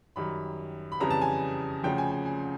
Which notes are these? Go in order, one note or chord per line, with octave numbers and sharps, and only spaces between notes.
F#2 D#3 G3 B5
B5
F2 C#3 E3 G3 A#5
A5
G#5
D2 C#3 F3 G5
G#5
G#5
G#5